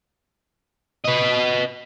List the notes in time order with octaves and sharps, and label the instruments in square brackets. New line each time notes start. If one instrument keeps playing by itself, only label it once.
[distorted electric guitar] B4 D#5